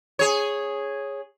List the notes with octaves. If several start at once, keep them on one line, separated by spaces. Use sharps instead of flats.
G#4 C#5